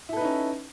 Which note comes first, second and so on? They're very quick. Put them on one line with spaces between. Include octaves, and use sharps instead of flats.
E4 A4 B4 D#4 C#4